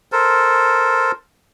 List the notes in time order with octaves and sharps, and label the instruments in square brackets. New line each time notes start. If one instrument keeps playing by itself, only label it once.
[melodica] A4 A#4 C5